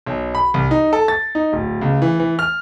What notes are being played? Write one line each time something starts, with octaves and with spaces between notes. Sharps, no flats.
B1
B5
C2
D#4
A4
A6
D#4
D1
C#2
E3
E3
F6